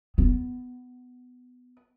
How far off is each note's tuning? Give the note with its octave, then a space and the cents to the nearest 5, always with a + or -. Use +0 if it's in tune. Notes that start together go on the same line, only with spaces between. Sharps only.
B3 +15